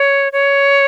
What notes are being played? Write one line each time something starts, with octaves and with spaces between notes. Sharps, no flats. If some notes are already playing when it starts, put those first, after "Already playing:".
Already playing: C#5
C#5